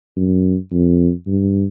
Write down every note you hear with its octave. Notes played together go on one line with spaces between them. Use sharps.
F#2
F2
G2